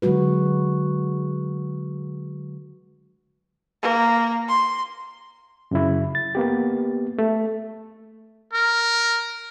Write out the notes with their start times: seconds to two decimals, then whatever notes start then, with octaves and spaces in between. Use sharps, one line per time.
0.02 D3 F#3 G#3 F#4 B4
3.83 A#3
4.48 C6
5.71 F#2 C#3 E4
6.15 A6
6.35 A#3 B3 G4
7.19 A3
8.53 A#4